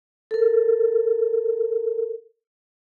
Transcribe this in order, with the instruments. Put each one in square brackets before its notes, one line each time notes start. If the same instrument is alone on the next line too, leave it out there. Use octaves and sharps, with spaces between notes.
[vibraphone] A4 A#4